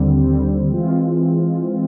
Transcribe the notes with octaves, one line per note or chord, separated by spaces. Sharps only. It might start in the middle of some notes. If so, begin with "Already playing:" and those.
Already playing: D#2 D3 G3 C4
D#2 D3 G3 C4
E3 G#3 C4 F4